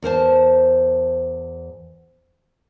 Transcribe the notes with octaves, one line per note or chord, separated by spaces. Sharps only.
E2 A#4 C5 A5